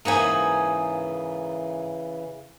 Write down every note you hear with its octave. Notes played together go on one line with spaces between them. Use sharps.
G#2 C#3 E3 A#3 B3 D#4 F#5 G#5